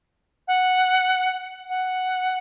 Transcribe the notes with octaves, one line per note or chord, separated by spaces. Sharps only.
F#5
F#5